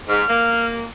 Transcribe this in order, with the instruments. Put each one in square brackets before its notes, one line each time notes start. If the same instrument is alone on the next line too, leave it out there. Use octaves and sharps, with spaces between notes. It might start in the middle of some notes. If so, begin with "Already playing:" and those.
[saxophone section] G#2 [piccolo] F6
[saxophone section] A#3